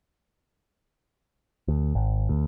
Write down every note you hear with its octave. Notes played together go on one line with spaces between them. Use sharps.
D2
G#1
D2